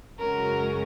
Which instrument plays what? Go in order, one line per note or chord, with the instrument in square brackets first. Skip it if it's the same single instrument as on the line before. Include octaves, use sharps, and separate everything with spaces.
[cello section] F#2 C#3 G#3 C#4 F#4 [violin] A#4